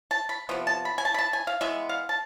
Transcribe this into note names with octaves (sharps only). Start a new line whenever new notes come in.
A5
B5
C3 F3 B3
A5
B5
G#5
A5
B5
A5
G#5
F5
E3 G#3 B3 E5
F5
A5